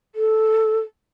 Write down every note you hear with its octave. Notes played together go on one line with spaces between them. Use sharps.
A4